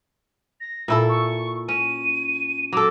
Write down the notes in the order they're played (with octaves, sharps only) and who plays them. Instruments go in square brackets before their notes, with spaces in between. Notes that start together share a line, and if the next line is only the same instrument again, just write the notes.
[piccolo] A#6
[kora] A#2 E4 A4
[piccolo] C#6
[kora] C#4 [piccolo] D#7
[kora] F#3 A4 [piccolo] D6